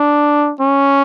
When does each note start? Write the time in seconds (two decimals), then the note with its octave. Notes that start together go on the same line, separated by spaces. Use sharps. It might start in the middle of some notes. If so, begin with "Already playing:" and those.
Already playing: D4
0.60 C#4